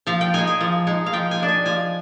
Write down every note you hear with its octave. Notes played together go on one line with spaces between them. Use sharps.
F3 F5
G5
G#3 D#4 G#5
G#5
F3
G#3 D#4
F5
F3 G5
G#5
G#3 D4
G#5
F3 G#5